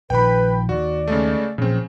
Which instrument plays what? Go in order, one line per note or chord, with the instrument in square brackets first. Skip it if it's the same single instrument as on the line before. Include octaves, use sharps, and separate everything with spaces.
[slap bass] A#1 D#3 F3 [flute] B4 [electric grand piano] G5 B5
[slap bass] D#2 [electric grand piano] F#4 [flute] D5
[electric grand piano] C#3 G#3 A3
[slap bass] A#2 F3 F#3 [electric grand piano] C#3 C4